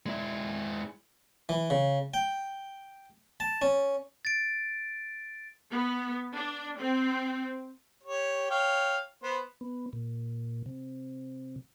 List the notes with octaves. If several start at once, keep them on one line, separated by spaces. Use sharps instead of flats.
G#3 E4
E3
C#3
G5
A5
C#4
A6 D7
B3
D4
C4
G4 C#5
C#5 F5 G5
B3 C5
B3
A#2
C3